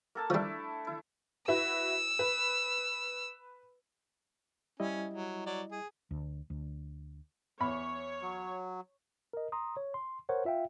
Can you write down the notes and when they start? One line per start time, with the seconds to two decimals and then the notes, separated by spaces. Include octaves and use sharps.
0.15 A#3 A4 A5
0.30 F3 G3 A3 D4 E4
0.87 E4
1.48 E4 F#4 B4 E6
2.19 B4
4.80 G3 C#4 E4 D#5
5.13 F#3
5.46 F#3 D5
5.71 G#4
6.11 D2
6.50 D2
7.60 E2 C#5 B5
8.22 F#3
9.33 A#4 D#5
9.52 A#5 C6 D#6
9.77 C#5
9.94 C6
10.29 A#4 C5 C#5 F#5
10.45 F4 E5 F5 G5